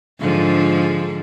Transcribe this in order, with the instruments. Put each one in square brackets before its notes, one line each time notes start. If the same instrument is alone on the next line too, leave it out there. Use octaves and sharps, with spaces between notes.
[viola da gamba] G#2 D3 F3